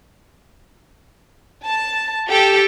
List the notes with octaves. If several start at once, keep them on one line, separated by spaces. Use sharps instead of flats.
A5
G4 A4 G5